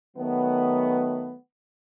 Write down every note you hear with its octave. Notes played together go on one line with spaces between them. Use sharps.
D#3 F#3 A3 B3